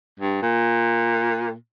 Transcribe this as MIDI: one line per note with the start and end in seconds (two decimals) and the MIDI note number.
0.20 0.40 43
0.42 1.53 46